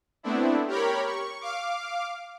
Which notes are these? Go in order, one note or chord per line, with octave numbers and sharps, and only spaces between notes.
A3 B3 C4 D4 E4
G4 A#4 C#5 B5
C#6
F5 D6